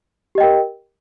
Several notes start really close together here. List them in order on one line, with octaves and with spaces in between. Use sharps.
G4 D#5 G5 A#4